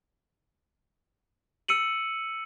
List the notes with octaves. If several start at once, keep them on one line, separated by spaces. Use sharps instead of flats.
E6 C#7 D#7 F#7